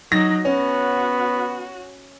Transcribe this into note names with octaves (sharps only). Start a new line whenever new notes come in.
F#3 D#4 A#6
B3 C#4 F#4